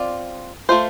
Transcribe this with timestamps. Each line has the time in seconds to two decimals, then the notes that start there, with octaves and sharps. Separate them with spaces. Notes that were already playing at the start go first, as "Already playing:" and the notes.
Already playing: C4 F4 D5
0.69 A3 F4 C5